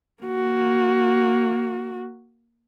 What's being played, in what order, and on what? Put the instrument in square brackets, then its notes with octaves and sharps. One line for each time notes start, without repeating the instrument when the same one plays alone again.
[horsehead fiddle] A#3 F#4